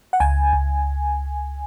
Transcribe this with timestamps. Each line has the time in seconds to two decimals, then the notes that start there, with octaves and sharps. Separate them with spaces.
0.13 F#5
0.20 C#2 G#5
0.53 C#2